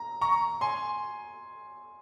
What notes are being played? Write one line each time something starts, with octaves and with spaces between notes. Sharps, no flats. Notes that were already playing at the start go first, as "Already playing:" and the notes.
Already playing: A#5
A#5 C#6
G#5 C6